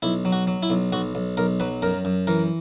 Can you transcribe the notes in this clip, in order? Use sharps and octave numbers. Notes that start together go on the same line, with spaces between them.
B1 E4
F#3
F#4
F#3
E4
B1
B1 F#4
B1
B1 A#4
F#3 B4
F#2 A#4
F#2
E3 A#4